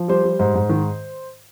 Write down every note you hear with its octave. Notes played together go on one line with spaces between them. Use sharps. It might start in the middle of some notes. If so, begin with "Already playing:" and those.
Already playing: F3
G3 C5
G3
G#2 C5
G#2
D#3